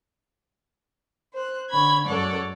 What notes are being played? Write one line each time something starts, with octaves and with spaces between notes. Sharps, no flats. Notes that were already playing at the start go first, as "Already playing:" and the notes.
C5 F#6
D3 C#5 B5 G#6
F#2 G#3 A4 C#5 D5 F#5